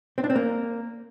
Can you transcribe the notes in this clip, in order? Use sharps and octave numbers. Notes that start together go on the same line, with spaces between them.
C4
D4
C4
A#3